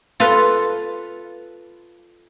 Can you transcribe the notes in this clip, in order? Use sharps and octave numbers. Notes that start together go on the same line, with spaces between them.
F4 A4 B4